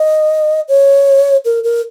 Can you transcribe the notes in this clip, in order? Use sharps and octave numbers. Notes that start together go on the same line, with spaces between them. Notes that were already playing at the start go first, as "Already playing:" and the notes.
Already playing: D#5
C#5
A#4
A#4